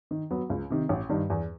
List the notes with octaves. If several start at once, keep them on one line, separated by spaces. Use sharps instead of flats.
D#3
F#3 B3
C#2
C3 D#3
A1
G2 D#3
E2